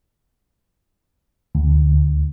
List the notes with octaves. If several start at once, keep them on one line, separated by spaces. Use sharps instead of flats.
D2